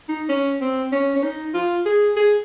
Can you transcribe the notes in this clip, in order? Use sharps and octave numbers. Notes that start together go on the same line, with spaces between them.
D#4
C#4
C4
C#4
C#4
D#4
F4
G#4
G#4